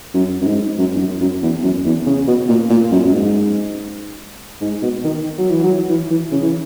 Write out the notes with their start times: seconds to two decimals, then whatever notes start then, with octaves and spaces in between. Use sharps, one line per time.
0.14 F#2
0.41 F#2
0.45 G#2
0.78 F#2
0.95 E2
0.99 F#2
1.20 F#2
1.42 E2
1.63 F#2
1.85 E2
2.06 C#3
2.27 B2
2.48 A#2
2.70 A#2
2.91 F#2
3.05 F#2
3.12 G#2
4.61 G#2
4.82 B2
5.04 D#3
5.38 F#3
5.50 E3
5.63 F#3
5.89 E3
6.10 E3
6.31 C#3
6.42 E3